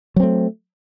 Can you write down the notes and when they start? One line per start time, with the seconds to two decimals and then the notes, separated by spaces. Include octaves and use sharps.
0.16 F#3
0.20 C4
0.23 A3